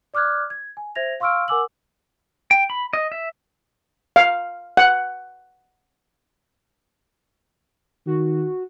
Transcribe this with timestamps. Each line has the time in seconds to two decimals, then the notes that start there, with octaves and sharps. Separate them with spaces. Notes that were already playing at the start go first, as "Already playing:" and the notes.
0.14 D5 D6 F6 F#6 G#6
0.50 G#6
0.77 G#5
0.95 C5 E5 G#6 A#6 F7
1.20 F5 C6 C#6 E6 F6 D7
1.48 A#4 F#5 G#5 D6 E6 F#7
2.51 G5
2.70 B5
2.93 D#5
3.12 E5
4.16 F5
4.77 F#5
8.07 D#3 F#4